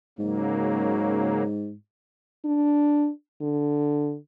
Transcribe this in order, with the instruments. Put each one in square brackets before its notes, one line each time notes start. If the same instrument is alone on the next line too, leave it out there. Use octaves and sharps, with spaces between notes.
[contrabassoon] G#2 [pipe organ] C#3 F#3 A#3
[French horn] D4
D3